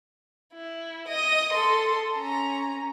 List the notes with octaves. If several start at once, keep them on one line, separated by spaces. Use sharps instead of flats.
E4
D#5 D#6
A4 C6
C#4 A#5